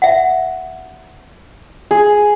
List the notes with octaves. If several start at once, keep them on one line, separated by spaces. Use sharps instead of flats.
E5 F#5
G#4